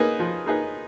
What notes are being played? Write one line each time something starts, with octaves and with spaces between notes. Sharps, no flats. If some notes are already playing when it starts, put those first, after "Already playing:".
Already playing: A#3 D#4 G#4 B4
F3
A#3 D#4 G#4 B4